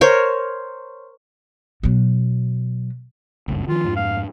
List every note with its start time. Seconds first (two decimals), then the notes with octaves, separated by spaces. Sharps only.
0.01 A#4 C5 C#5
1.83 B2 F#3
3.48 F#1 C#2 G2
3.68 D#3 F3 F4
3.84 F2 G#2
3.96 F5